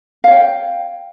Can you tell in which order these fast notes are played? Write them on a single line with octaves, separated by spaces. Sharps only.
F5 C#5 G5